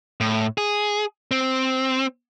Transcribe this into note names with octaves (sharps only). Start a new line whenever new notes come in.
A2
G#4
C4